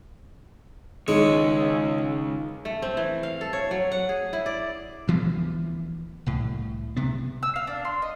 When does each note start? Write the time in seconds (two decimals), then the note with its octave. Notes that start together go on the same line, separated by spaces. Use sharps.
1.08 C#2 D#3 G#3 C#5
2.65 A3
2.82 C4
2.97 E3
3.23 F5
3.41 A4
3.53 C#5
3.71 F#3
3.92 F#5
4.09 G#4
4.33 E4
4.46 D5
5.08 D2 E3 F3 B3
6.26 C2 A2
6.97 C3 B3
7.43 E6
7.56 F5
7.67 D4
7.85 C6
8.02 D#5